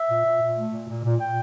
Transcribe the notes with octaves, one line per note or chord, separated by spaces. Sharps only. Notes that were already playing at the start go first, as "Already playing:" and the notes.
Already playing: E5
A#2
A#2
A#2
A3
A#2
A#2
A#2
A#2 G5